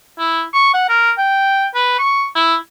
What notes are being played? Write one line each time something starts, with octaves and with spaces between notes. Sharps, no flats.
E4
C#6
F#5
A#4
G5
B4
C#6
E4